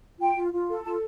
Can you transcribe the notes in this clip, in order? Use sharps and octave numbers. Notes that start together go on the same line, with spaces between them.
F4 G5
F4
F4
A4
F4 A5